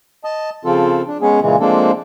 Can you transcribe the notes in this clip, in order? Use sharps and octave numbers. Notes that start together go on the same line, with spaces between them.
D#5 A5
C#3 F3 C4 F4 A4
D4
G#3 B3 C#4 G#4
A#2 C#3 E3 G#3
F3 G#3 A#3 C4 D4 A4